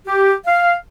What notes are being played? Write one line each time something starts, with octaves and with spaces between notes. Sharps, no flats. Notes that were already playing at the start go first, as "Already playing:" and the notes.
G4
F5